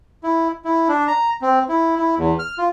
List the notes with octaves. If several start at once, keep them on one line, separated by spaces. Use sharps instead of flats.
E4
E4
D4
A#5
C4
E4
E4
E2
F6
F4